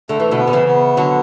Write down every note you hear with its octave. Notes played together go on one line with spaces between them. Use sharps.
D3 A3
E3
B2 D3
B3
D3
C#3 E3
B3
D3 F#3